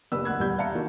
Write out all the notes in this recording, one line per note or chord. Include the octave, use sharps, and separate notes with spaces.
F#1 G4 B4 D5 B5 E6
D2 F#5 F#6 G#6
D#1 E2 G3 B5 G6
D5 E5 F5 A5 A#5 C#7
D#3 A#3 F#4